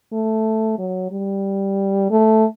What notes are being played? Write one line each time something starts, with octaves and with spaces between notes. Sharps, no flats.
A3
F#3
G3
A3